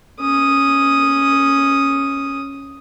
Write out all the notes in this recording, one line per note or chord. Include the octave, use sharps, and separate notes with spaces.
C#4 D#6